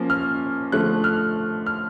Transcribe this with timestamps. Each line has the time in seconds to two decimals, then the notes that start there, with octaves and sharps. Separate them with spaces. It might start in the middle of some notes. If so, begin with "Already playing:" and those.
Already playing: F3 A#3 C#4
0.10 F6
0.72 D3 F3 A3 F#6
1.04 F6
1.66 F6